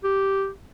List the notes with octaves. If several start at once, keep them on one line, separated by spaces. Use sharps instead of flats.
G4